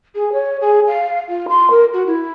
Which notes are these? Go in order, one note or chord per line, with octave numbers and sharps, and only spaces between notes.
G#4
C#5
G#4
F5
F4
C6
A#4
F#4
E4